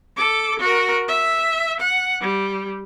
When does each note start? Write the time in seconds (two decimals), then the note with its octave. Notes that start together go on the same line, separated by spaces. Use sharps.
0.17 A4 D6
0.59 F#4 A#4
1.08 E5
1.80 F#5
2.21 G3